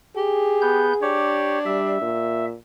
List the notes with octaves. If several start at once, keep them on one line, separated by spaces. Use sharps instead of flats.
G4 G#4
B3 G6
D4 G4 C#5
G3 E5
A#2